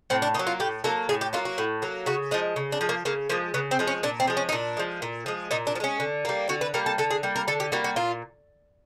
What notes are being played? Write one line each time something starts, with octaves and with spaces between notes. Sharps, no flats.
A2 C4
D4
F#3 A#3 D#4
F4
A2 G4
F#3 A#3 A4
A2 G#4
G4
F#3 A#3 F4
F#4
A2
F#3 A#3
C#3 F#4
F3 G#3 D#4
C#3
D4
F3 G#3
A#3
C#3 A#3
F3 G#3 A#3
C#3 B3
C4
F3 G#3
C#4
A#2 D4
C4
F3 G#3
C#4
D#4
A#2 D4
F3 G#3
A#2
F3 G#3
A#2 D#4
D4
F3
G#3 C#4
D3
G3 A#3
D3 F#4
B4
G3 A#3 A#4
A4
D3 A4
G#4
G3 A#3
A#4
D3 A4
G4
G3 A#3 F#4
F#4
A#2 F4